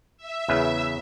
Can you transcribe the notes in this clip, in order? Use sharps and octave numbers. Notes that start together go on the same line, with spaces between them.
E5
E2 C#3 B4